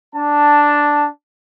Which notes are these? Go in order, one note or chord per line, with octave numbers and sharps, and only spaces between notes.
D4 A5